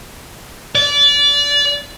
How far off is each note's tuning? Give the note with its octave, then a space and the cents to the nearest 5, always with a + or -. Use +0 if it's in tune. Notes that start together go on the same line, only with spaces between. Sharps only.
D5 -25